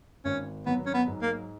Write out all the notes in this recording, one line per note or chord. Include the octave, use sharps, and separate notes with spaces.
G#1 C#4
F#3 B3
C#4
B3
G#2
A#3